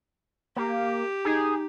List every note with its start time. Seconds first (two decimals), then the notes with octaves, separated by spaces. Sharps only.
0.56 A#3 G4
1.25 D#4 G#4